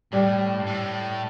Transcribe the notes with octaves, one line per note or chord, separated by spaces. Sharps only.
A2 G3
G2
A2